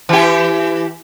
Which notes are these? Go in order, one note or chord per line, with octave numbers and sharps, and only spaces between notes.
E3 G4